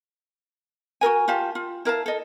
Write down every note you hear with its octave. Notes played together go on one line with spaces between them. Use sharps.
F#4 G#4 A#4 G#5
F4 G4 F5 A5
F4
E4 A#4 F5 A5
A4 D#5